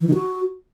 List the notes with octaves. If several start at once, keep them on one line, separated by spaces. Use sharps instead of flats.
E3
D#3
F#4